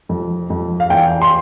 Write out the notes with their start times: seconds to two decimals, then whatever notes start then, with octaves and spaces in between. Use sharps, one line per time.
0.09 F2
0.50 F2
0.80 F5
0.90 E2 G5
1.22 C6